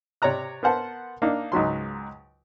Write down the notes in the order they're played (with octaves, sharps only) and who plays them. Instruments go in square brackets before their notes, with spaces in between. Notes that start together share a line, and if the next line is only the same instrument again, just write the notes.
[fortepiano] C3 C#5 D5 A#5 F#6
B3 A#4 C5 F#5 A5
A#3 D4 D#4
C#2 G#2 F#3 C6